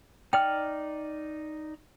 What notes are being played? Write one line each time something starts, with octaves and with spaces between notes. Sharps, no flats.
D#4 D5 G5 F6